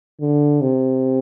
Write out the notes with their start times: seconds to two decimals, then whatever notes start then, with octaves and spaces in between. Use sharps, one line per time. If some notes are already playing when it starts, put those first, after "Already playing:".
0.21 D3
0.61 C3